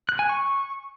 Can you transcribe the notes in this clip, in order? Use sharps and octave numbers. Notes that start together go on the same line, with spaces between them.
F#6
G#5
C#6